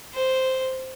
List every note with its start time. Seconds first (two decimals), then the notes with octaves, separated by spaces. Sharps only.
0.14 C5